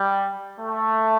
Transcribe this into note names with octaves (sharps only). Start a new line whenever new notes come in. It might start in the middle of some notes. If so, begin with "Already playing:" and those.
Already playing: G3
A3